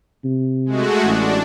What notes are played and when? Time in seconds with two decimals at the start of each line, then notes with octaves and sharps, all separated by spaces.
0.25 C3
0.66 G#3 A3 F#4
1.05 A1 D4